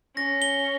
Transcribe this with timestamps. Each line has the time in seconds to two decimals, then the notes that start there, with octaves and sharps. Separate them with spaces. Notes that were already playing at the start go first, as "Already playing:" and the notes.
0.16 C#4 A#6
0.42 G7